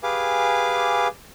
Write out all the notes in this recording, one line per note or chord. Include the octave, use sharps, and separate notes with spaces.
G4 G#4 B4 F5 G#5 D6